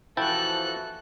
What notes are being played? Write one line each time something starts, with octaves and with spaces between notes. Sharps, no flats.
E3 F3 E4 F#4 A4 G5 A5 F#6